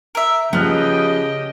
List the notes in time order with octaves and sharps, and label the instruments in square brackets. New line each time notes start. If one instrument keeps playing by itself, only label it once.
[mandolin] A#4 E5
[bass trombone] C#3 [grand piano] F3 F6 F#6 [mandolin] B3 [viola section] G4 D#5 G5